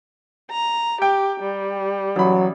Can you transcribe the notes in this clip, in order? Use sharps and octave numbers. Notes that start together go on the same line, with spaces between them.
A#5
G4 G5
G3
A1 F#3 B5